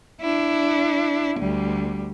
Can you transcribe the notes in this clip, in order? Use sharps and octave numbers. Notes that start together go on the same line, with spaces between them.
D4 E4
D2 G3